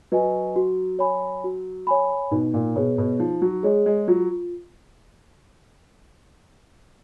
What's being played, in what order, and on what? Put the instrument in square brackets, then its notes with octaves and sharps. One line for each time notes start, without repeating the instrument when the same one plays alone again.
[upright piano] F#3 [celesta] B4 D#5 G#5
[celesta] F#4
C#5 G#5 B5
F#4
C#5 G#5 B5
[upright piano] B2 [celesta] D#4
[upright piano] A#2
[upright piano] B2 [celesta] G#4 C#5
[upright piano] B2
[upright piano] F3 [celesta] D#4
[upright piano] F#3
[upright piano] G#3 [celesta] G#4 C#5
[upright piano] G#3
[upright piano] F#3 [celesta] F4